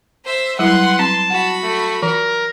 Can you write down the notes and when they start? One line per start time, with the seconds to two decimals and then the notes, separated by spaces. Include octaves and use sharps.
0.25 C5 E5
0.59 F#3 G3 E4 B4 F#5 C6
0.99 C4 A5
1.30 F#4 F#5 B5
1.63 A3
2.03 E3 A#4